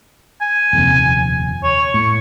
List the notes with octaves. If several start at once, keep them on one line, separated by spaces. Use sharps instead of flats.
G#5
D#1 F2 C3
C#5
A2 C#6